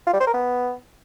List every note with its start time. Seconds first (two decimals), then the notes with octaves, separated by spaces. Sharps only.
0.07 F4
0.13 G3
0.20 C5
0.27 A#4
0.34 B3